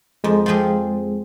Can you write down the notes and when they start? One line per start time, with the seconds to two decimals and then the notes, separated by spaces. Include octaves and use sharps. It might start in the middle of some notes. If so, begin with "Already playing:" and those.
0.24 F2 G#3
0.46 F3 C4 F4 G#4